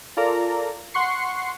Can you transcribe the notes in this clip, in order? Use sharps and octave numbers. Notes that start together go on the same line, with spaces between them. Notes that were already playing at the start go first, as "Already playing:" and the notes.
F4 A4 A#4 D5 A#5
F#5 C6 C#6 C7 C#7